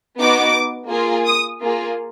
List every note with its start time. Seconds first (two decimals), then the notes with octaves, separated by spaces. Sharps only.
0.19 B3 D#4 F#4 D6
0.89 A#3 F4 G#4
1.26 D#6
1.61 A#3 F4 G#4